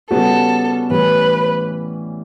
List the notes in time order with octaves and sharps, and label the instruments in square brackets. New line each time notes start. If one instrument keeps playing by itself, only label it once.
[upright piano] C#3 G3 B3 F#4 [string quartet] A4
[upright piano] A2 E3 G3 C#4 G4 [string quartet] B4